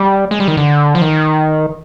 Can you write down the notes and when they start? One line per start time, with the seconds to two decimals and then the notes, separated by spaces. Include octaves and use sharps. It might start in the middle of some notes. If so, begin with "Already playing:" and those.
Already playing: G3
0.31 G#3
0.40 G3
0.48 D#3
0.57 D3
0.95 F3
1.02 D#3